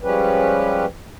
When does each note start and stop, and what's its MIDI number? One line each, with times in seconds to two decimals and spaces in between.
0.03 0.85 53
0.03 0.85 55
0.03 0.85 56
0.03 0.85 61
0.03 0.85 67
0.03 0.85 71